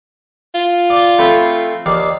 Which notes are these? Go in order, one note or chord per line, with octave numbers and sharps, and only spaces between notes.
F4
D5 D6
A3 C4 B5
D#2 D5 F5